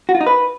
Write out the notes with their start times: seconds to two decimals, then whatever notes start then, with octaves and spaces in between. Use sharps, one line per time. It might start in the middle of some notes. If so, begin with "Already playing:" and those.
0.09 F#4
0.15 F4
0.21 D#4
0.27 B4